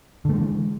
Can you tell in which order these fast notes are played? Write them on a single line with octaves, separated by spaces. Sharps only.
D3 A3 G#3 E3